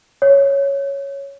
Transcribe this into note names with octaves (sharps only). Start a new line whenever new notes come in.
C#5